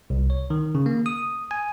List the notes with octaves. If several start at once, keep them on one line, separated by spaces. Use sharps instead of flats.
C2
C#5
D#3
C#3
A#3
D#6
G#5